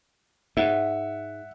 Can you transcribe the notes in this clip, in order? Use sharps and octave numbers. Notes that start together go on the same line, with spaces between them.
G#2 E5 F#5